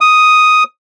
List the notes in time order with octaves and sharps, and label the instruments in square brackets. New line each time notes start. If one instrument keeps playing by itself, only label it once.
[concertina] D#6